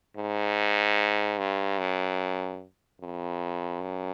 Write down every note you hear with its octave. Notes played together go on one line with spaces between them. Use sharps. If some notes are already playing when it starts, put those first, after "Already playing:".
G#2
G2
F#2
F2
F#2